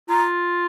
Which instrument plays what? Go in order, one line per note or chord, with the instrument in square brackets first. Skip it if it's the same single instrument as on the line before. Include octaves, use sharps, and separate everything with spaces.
[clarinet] F4 [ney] A#5